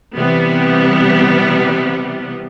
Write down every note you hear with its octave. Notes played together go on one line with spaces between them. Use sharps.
C3 E3 G3 B3